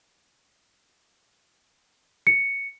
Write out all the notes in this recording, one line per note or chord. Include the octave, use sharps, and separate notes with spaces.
C#7